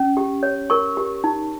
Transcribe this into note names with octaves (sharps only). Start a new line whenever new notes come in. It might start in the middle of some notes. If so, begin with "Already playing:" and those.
Already playing: C#4
G4
C#5
A#4 C#6
G4
D#4